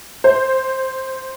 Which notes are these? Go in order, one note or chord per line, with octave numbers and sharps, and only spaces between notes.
C5